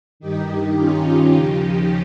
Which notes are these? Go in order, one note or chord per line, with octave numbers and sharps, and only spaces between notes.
G2 D#3 D#4 G4
C#4 F4
D#2 C#3 F3 D#4 G4